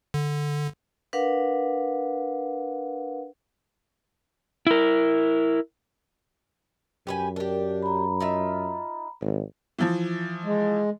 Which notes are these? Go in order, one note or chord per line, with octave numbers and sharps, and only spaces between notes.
D3
D4 A#4 B4 F5 F#5
E4 A#4
F#2 G4 B4 G#5
D4 G4 A#4
A#5 B5
D#4 F4 E5
G#1
E3 F3
G#3